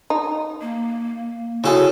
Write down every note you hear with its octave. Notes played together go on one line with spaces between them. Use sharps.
D#4
A#3
C#3 E4 F#4 G#4 A4